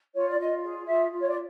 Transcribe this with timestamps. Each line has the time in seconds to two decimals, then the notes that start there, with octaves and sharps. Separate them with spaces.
0.15 F4 C#5
0.27 D5
0.39 F4 D#5
0.63 G#4
0.87 F4 E5
1.11 F4
1.21 C#5
1.28 D5